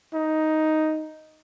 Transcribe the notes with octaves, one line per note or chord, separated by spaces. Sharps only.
D#4